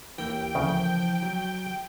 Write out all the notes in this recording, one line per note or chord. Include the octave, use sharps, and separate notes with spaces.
D#2 E3 A#3 G5
D2 C#3 F3
F#3